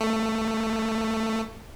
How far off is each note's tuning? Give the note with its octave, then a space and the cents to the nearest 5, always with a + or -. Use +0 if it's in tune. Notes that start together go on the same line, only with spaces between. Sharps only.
A3 +15